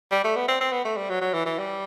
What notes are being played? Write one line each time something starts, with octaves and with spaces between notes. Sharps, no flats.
G3
A3
B3
C4
C4
B3
A3
G3
F#3
F#3
E3
E3
G3